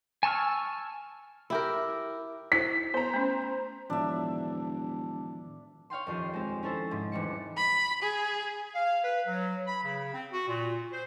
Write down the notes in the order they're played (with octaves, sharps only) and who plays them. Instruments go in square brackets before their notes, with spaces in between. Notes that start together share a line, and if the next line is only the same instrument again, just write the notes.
[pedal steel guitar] G#5 A5 C#6 E6 F6
[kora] E4 G4 A#4
[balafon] E4 C5 [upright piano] B6
[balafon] B3 [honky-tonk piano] C5 A#5
[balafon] A3 C#4
[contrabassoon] E1 [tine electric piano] A2 D#3 F3 [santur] D4 E5
[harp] C#5 F5 G5 C6
D#1 F2 G6 D#7
G#3 C4
C#4 E4 A4 C5
G#2 C3
E1 E3 G3 C#7
[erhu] B5
G#4
[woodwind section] F5
B4
F#3
B5
C#3
C4
F#4
A#2
C5